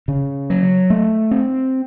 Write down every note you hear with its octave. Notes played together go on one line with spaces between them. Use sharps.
C#3
F#3
A3
C4